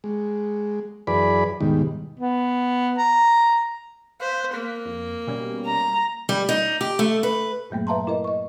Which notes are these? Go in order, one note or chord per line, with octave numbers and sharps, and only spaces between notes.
G#3
F#2 E3 G#4 B4 D5 B5
D#2 G#2 B2 D#3 G3
B3
A#5
C5 F5 F#6 B6
A#3
F2
B2 G3 C#4
A#5
G3
D#4
G4
A3
B4
G2 A#2 F#3 A3 A#3
B4 E5 F5 A5 A#5 C6
E4 A#4 B4 D#5
D#5 C#6